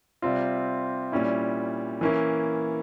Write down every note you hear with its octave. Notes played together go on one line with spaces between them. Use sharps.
C3 G3 C4 F4
A#2 G3 C#4 E4
E3 A#3 C#4 E4